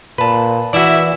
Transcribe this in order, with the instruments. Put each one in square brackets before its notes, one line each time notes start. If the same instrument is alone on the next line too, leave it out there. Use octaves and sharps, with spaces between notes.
[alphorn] A#2 [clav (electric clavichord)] B4 A5
[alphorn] E3 [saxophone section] E4 E5 [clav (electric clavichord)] F#4 D5